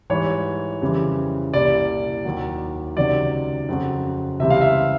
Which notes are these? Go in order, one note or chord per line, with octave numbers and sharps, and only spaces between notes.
G#2 E3 G3 C#5
F2 C#3 E3 G3
C2 A#2 G3 D5
D#2 D#3 F#3
C#2 C3 D#3 F#3 D5
F2 C#3 F#3
C#2 C3 E3 G3 E5
F5
E5